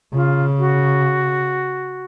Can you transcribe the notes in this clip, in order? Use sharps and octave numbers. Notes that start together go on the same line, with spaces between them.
C#3 F4
F#4